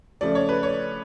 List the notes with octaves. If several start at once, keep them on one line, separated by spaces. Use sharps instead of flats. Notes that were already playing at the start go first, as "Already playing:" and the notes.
C#3 F3 A3 D5
C#5
B4
C#5